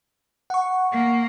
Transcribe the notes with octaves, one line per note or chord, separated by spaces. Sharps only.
F#5 C#6
A#3